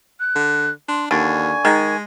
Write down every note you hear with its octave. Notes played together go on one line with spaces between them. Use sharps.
F#6
D3
D4 C6
D#2 D3 G#5 C#6
D#3 G#3